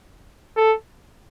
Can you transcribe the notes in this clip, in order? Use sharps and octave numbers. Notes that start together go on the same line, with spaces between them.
A4